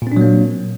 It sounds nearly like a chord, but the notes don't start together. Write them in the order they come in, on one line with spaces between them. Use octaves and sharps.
A#2 C4 D4 F#3 A#3